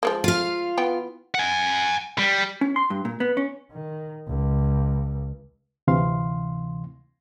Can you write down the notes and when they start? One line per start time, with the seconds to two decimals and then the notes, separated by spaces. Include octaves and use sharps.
0.03 F3 G#3 A#3
0.24 F4 F5
0.78 E3 B3 G5
1.35 F#5 G#5
2.19 G3
2.61 C#4
2.76 C6
2.90 G2
3.05 A#2
3.20 B3
3.37 C#4
3.72 D#3
4.29 C#2
5.87 D2 C3 E3 F5 C6